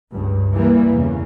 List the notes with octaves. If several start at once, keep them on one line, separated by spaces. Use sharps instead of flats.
C#2 G2
G2 E3 G3 A#3
E2 C#3